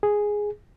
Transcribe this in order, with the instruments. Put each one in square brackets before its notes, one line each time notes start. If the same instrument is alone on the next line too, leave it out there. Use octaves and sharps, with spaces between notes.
[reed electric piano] G#4